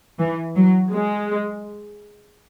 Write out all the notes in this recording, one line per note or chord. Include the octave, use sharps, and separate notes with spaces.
E3
F#3
G#3